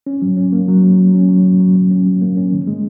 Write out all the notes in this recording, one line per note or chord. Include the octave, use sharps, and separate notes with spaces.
C#4
F#3
C#4
A#3
F#3
F#3
F#3
C#4
F#3
F#3
F#3
F#3
C#4
F#3
A#3
C#4
D#3
G#3